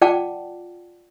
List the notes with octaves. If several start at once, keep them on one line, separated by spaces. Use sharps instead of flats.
F4 D5 F#5 G5 A5 D6